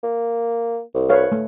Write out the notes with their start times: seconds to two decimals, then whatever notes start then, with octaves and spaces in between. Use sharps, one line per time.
0.03 A#3
0.94 C2
1.09 B4 C#5 F5
1.32 A3